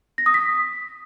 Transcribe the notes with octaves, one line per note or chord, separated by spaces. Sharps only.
A#6
D#6
B6